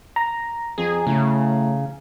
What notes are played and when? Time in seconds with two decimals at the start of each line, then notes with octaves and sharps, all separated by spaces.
0.16 A#5
0.78 F2 G#4
1.07 A2 C#3